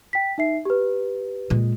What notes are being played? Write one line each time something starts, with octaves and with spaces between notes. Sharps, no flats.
G5 B6
D#4 E5 C7
G4 B4
A#2 G#3